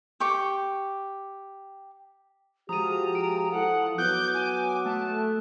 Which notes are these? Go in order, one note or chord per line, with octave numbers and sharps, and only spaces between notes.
G4 C#6 D6
F3 G#3 F#4 G4 A#5 D#6 D#7
D7
E4 A4 F#5
F#3 B3 D6 F#6 G6
G#5
A3 A5